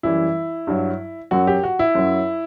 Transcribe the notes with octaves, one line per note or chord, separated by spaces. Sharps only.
F#2 E3 G3 E4
G2 F#3
F#2 F#3 F#4
G4
F#4
E4
F#2 F#3